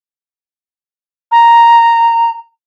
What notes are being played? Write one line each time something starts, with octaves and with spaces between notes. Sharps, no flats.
A#5